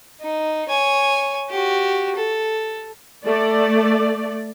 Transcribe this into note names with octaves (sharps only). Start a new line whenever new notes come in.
D#4
C#5 G#5
F#4 G4
A4
A3 D5